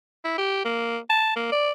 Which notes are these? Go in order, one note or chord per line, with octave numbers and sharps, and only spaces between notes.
E4
G4
A#3
A5
A#3
D5